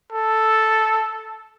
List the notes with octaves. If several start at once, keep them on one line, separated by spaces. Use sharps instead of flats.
A4